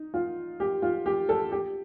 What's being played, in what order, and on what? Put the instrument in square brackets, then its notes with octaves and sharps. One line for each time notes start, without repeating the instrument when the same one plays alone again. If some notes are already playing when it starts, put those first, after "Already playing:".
Already playing: [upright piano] D#4
F4
G4
F4
G4
A4
G4